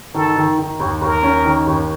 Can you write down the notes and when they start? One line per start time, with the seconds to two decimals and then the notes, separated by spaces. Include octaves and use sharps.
0.14 D#3 A4
0.36 D#3
0.58 D#3
0.80 D#2
1.01 D#2 A#4
1.23 C#4
1.45 D#3
1.67 D#2